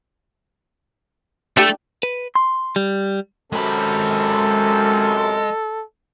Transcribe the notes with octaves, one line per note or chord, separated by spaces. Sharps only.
A3 D4 E4 G4 A4
B4
C6
G3
F#2 C3 G#3 A4 B5